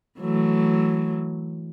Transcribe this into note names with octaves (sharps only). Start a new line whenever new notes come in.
E3 F#3 A3